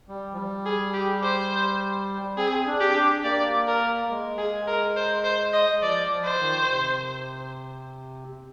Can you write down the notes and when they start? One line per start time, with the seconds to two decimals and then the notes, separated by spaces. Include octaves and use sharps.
0.08 G3
0.33 F3
0.37 G3
0.66 G#4
0.94 G4
1.23 C5
2.37 C4 G#4
2.67 D4
2.80 G4
2.95 D4
3.24 A#3 D5
3.67 A#4
4.10 G#3
4.38 G#4
4.67 A#4
4.97 C5
5.24 C5
5.53 D#5
5.82 F3 D5
6.11 F3
6.25 C5
6.39 D#3
6.69 C3